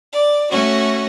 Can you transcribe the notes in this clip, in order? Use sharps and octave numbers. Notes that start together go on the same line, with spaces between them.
D5
A3 C#4 F#4